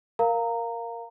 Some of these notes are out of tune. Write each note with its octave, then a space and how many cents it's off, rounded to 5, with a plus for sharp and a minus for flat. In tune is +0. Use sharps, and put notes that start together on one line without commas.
A#4 +0 F5 +0 A#5 -15